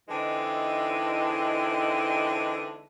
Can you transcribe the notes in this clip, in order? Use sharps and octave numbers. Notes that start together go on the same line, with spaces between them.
D3 E3 G#3 C4 D#4 E4